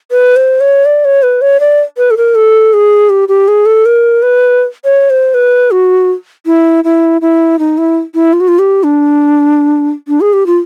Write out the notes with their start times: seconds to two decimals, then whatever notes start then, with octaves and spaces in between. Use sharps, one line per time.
0.11 B4
0.36 C5
0.60 C#5
0.85 D5
1.05 C#5
1.23 B4
1.41 C#5
1.60 D5
1.97 B4
2.11 A4
2.17 A#4
2.35 A4
2.73 G#4
3.10 G4
3.28 G4
3.48 G#4
3.66 A4
3.86 A#4
4.23 B4
4.85 C#5
5.10 C5
5.34 B4
5.71 F#4
6.46 E4
6.84 E4
7.21 E4
7.59 D#4
7.78 E4
8.15 E4
8.33 F4
8.40 F#4
8.48 F4
8.59 G4
8.84 D4
10.08 D4
10.21 G#4
10.33 G4
10.47 F4